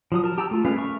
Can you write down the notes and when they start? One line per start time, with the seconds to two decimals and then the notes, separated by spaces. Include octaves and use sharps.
0.12 F3 F#3 D#6
0.24 A#4 A5
0.38 G4 G5 A5 A#5 E6
0.51 A3 F4
0.65 G#3 A3 C#4 B4 F5
0.78 A#4 E5 C#6